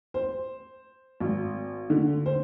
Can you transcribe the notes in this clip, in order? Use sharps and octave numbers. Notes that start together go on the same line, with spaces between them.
C5
G#1
D3
C5